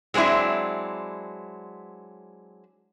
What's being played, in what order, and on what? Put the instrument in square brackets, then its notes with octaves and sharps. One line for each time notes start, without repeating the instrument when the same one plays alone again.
[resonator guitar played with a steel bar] F#3 G#3 C4 D4 E4